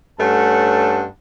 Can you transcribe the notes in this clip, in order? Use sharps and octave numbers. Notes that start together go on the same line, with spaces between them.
G2 A3 C#4 F#5 A5